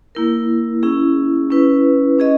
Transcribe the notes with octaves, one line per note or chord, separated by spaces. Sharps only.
A#3 E4 A#4
C#4 E4 G#4
C#4 E4 B4
C#4 G#4 D#5